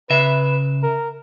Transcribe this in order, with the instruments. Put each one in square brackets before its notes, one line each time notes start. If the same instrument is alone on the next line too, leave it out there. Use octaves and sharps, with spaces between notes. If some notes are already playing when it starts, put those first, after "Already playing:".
[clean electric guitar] C#3 E5 [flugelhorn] B4
[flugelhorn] A#4